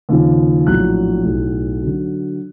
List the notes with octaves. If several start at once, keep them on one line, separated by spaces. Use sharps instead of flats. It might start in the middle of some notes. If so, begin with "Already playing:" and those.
D#2 C#3 F3
A#1 A2 F#3 F#6
B1 A2 F#3
D3 F#3